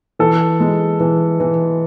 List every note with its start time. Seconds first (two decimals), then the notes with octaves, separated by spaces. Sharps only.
0.19 E3 A4
0.60 G#3
1.00 E3
1.40 E3